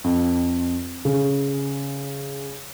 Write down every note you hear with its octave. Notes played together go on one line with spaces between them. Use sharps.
F2
C#3